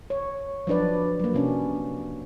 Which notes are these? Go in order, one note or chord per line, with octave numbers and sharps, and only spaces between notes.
C#5
F3 F#3 D4 B4 D5
F#3 A#3
C3 C#4 D4